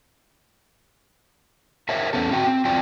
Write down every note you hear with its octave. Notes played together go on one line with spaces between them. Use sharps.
A#4 C5 C#5 E5
E2 A#2 A3 B3 C#4 A4
C4 F#4 G5
C4
E2 C4 F4 D5 G5